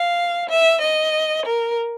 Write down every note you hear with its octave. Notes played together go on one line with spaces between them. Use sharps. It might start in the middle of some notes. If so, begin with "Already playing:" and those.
Already playing: F5
E5
D#5
A#4